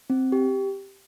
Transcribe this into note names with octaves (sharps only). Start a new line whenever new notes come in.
C4
G4